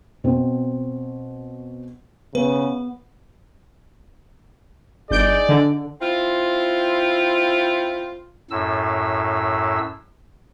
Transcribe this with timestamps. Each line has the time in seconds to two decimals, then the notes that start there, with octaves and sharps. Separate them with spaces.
0.24 B2 C4
2.35 C#3 B3 B4
5.11 G1 D#4 G#4 D5 G6 D7
5.49 D3
6.01 C4 E4 F4
8.51 F#2 A2 E6